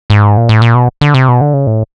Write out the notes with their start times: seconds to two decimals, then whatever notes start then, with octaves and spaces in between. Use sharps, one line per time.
0.10 G#2
0.37 A#2
0.49 A2
0.62 A#2
0.75 B2
1.01 D3
1.14 C3
1.28 B2
1.41 D3
1.54 C#3
1.67 A2